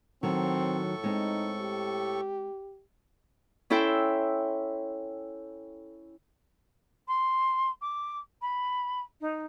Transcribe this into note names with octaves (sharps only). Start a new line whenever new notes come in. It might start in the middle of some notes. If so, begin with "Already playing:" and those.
A2 D#3 F#3 C4 A4 C#6
G#3 C4 D#4
G4
C#4 E4 A4 E5 G5 C6
C6
D6
B5
D#4